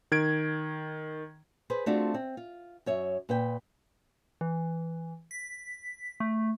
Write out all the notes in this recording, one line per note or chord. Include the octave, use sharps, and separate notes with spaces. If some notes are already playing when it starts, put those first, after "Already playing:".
D#3 G#6 D7
G#4 B4 C5
A3 C4 D4 F4 F#4 G#4
C4
F4
F#2 C#5 E5
A#2 B4 G5
E3
B6
A3